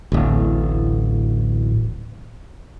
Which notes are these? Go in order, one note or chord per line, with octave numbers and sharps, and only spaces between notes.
D1 A1